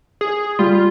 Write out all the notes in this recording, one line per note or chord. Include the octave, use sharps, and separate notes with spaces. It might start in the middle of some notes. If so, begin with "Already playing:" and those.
G#4
G3 F4